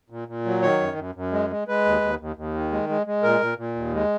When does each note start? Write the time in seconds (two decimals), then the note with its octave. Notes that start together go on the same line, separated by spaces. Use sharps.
0.10 A#2
0.28 A#2
0.45 F#3
0.62 D#3 C#5
0.81 F#2
0.97 F#2
1.15 F#2
1.32 G#3
1.50 G#3
1.68 G#3 B4
1.85 D#2
2.01 D#2
2.20 D#2
2.36 D#2
2.54 D#3
2.72 G#3
2.89 G#3
3.07 G#3
3.23 A#2 A#4
3.41 A#2
3.58 A#2
3.75 D#2
3.94 G#3